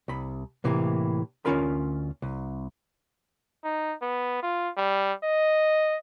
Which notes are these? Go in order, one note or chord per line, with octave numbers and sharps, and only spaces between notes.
C2 B5
A2 C3 E3 A#3
D2 D#3 C#4 F4 A#4 B5
C2
D#4
B3
F4
G3
D#5